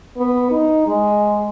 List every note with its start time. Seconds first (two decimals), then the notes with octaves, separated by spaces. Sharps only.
0.17 B3
0.51 D#4
0.87 G#3